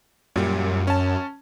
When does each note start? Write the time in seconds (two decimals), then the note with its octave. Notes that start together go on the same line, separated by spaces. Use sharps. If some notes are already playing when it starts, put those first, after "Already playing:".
0.36 F#2 A#2 G3
0.87 C#4 A5